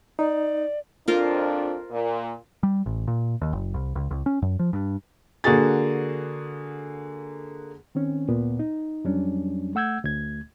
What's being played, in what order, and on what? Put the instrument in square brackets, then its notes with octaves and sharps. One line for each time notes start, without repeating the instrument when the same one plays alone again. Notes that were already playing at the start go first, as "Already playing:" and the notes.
[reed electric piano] D#4 [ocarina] D5
[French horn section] F2 D4 [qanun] F4 A#4 C5
[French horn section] A#2
[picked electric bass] G3
A1
A#2
D#2
F#1
C2
C#2
C#2
C#4
F#2
F3
G2
[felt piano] D3 A#3 F#4 G#4 A6
[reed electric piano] D#3 C4 C#4
D2 A#2 B3
D#4
F2 F#3 G3 C#4 D4
A3 F#5 E6 G6 G#6
D2 A3 G#6